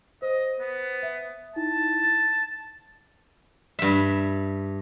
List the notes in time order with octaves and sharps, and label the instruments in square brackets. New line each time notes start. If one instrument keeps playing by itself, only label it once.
[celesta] C5 [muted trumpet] D#5
[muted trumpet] B3
[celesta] E5
[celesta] D#4 E4 [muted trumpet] A5
[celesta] A6
[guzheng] G2 E5